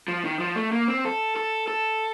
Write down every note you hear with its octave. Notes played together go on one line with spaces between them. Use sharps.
F3
D#3
F3
A3
A#3
C4
A4
A4
A4